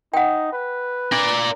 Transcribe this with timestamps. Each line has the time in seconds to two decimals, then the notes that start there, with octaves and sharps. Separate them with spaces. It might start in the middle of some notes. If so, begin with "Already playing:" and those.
0.14 D#4 F#5 G5
0.53 B4
1.12 D4 A#4 D5